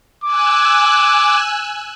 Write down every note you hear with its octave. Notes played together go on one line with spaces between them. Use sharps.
G#5 D6 E6 F#6